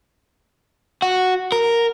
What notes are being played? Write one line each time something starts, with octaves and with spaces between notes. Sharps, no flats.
F#4
A#4